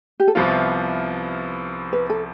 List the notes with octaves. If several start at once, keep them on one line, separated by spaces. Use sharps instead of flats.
G4
A4
C2 C3 F3 B3 F4 B4
B4
A4